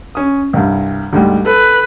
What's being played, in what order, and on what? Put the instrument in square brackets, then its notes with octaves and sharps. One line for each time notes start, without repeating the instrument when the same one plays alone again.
[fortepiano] C#4 D#6
C2 G2
D2 G#2 G3
[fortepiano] A4 [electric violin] B4